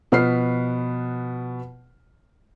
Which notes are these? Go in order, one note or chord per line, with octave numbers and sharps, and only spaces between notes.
B2 F3 B4 F6 B6 C7